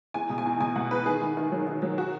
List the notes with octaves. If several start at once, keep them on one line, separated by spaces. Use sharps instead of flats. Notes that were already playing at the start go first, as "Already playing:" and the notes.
E2 G#5
B2
G#5
E2
B2 G#5
B2 F#5
E2 B4
D#3 G#4
D#3
D#3
F#3
D#3
F#3
F#4